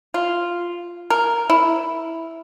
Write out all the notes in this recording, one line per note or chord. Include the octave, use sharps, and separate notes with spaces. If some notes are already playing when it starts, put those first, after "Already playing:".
F4
A#4
E4